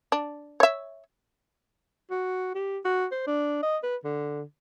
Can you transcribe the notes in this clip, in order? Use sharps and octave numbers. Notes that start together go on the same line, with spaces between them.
D4
C#5 E5
F#4
G4
F#4
C5
D4
D#5
B4
D3